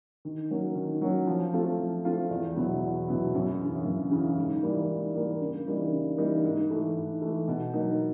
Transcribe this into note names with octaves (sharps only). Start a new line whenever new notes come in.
D#3
F#3 A#3 C#4
D#3
F#3 A#3 C#4
F3
A3 C4 F4
F3
A3 C4 F4
E2
B2 F#3 B3 E4
E2
B2 F#3 B3 E4
F#2
C#3 E3
F#2
C#3 E3
G#2
E3 G3 A#3
G#2
E3 G3 A#3
C#3
E3 G3 A#3 D#4
C#3
E3 G3 A#3 D#4
G#2
E3 A3
G#2
E3 A3
B2
F#3 A#3 D#4